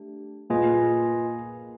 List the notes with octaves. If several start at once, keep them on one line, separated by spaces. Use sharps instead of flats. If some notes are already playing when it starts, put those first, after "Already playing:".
Already playing: A3 D4 G4
A#2 F4 G#4 B4 D#5 G#5